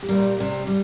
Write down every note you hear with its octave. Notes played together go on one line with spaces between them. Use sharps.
G4
A#2 G3 A#4
C3 G3
G3